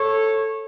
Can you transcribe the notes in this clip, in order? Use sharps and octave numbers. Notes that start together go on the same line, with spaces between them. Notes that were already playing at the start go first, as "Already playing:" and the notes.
Already playing: A4 C#5